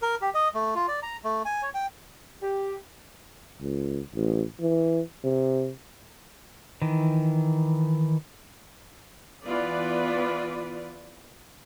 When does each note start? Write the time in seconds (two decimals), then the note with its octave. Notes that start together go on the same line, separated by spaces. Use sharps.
0.02 A#4
0.22 G4
0.34 D#5
0.54 A3
0.75 F4
0.88 D5
1.03 A#5
1.24 A3
1.45 G#5
1.62 C#5
1.74 G5
2.42 G4
3.61 C#2
4.15 A1
4.60 E3
5.24 C3
6.82 D#3 E3
9.45 E3 B3 F4 B4 D5